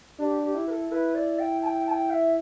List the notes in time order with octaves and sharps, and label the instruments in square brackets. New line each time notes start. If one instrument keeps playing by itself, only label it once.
[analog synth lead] D4 [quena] G4
[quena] G4
[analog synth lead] E4
[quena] B4
A4
[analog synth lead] E4 [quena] B4
[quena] D5
G5
A5
G5
A5
G5
E5